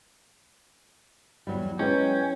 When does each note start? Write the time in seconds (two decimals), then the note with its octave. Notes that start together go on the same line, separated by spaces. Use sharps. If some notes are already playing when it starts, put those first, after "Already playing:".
1.47 E2 F#3 G3
1.79 F#3 G#3 C#4 E4 B4 G5